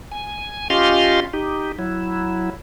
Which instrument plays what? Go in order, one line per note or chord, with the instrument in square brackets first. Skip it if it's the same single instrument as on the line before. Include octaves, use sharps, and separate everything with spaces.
[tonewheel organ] G#5
C#4 F4 G4 D#5 F5 C6
D#4 G4
F#3 E4